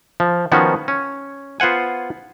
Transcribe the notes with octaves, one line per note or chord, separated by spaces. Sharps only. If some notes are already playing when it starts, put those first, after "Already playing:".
F3
D#3 F3 B3 C#4 D#4 F#4
C#4
B3 F4 C5 F#5 G#5